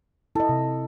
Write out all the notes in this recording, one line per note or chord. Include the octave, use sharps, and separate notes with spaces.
E4 A4 D#5
C3